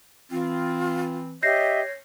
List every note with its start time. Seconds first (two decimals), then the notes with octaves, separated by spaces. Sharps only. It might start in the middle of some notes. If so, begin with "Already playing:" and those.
0.31 E3 C4 F4
1.43 G4 C#5 D#5 E5 G6 A#6 C7